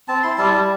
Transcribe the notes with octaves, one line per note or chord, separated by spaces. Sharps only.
C4 A5
E4 C6
G3 A5
G3